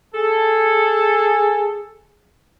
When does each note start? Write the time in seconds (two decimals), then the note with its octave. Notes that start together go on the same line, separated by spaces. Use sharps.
0.15 G#4 A4